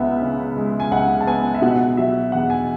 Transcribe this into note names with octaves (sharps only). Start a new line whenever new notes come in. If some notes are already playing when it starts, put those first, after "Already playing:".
Already playing: C#2 G#3 B3 E5 F#5
C#3
G#3
G#5
C#2 F#5
A5
B3 G#5
E5
B2 F#5
F#3 E5
E2 F#5
G#5